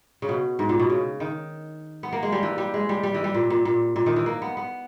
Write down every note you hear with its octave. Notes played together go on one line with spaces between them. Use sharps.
C#3
B2
G#2
A#2
B2
C#3
D#3
B3
A#3
G#3
G3
E3
G3
G#3
G3
G3
E3
G3
A#2
A#2
A#2
A#2
D#3
E3
A#3
B3
B3